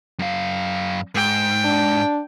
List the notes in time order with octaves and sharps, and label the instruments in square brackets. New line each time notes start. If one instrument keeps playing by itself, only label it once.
[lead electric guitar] F#2 F5
[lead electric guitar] G#2 [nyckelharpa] G5
[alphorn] D4